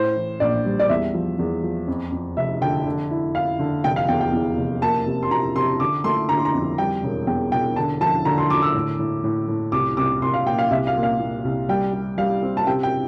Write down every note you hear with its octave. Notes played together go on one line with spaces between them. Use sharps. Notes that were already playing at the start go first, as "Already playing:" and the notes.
Already playing: A2 C5
E3
A#1 D5
G3
D5
E2 E5
F3
E2
F3
F2
F2
F1 E5
D3 G5
D3
E4
E4 F5
D3
F1 G5
F5
E2 G5
G5
E2
F1
A#3 A5
C3
C6
C3 A#5
C3 C6
D3 D6
A3 C6
D3 A#5
C6
A#5
F2
G3 G5
E1
E2 G5
E1 G5
D3 A5
F3 A5
D3 A#5
C6
D3 D6
E6
A2
A2
A2
A2
C2 D6
C2 D6
C2 C6
F5
A#2 G5
F5
C2 E5
F5
A#2
F5
A#2
C2
G3 G5
G3
G3 F5
C4
A5
C3 G5
G5